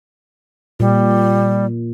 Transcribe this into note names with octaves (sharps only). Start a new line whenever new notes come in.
A#2 G3